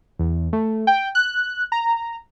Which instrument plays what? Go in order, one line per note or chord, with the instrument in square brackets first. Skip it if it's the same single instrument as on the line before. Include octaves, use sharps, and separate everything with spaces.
[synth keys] E2
A3
G5
F#6
A#5